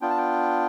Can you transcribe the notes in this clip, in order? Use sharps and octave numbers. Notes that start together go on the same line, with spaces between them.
B3 D4 F4 G5
A5
G5